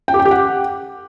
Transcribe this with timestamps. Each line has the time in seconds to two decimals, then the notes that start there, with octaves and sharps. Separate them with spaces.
0.08 G5
0.14 G4
0.20 G5
0.25 G4
0.31 F#5